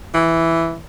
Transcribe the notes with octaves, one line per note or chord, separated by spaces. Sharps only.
E3